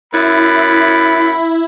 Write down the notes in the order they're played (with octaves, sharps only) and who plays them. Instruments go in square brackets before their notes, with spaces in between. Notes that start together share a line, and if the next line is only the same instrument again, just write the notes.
[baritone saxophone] F#2 [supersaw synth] E4 [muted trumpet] B5